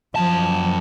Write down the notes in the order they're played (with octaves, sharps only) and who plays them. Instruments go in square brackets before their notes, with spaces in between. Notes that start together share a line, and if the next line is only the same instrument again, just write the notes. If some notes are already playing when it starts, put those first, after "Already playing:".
[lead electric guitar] F#2 A5 [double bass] F3